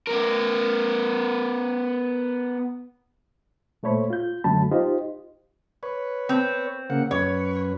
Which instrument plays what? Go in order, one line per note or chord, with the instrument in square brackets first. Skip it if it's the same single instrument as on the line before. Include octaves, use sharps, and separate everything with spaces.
[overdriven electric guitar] B3 A#4
[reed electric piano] A#2 A3 C5 C#5 B5
F4 G6
F#2 D3 F#3 A3 A5 B5
D#4 F4 G4 C5 D#5
[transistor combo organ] B4 C#5
[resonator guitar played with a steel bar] C4
[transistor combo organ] C#3 A#3 F#5
[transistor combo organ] F#2 B4 [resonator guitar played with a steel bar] C#5